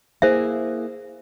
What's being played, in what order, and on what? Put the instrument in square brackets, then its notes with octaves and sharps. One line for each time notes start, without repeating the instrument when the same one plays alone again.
[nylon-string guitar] A#3 E4 G#4 [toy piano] C5 E5